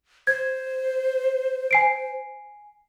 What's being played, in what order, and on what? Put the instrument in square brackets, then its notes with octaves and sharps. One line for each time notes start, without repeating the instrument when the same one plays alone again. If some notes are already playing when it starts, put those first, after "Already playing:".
[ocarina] C5 [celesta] G#6
[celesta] G#5 C7 D7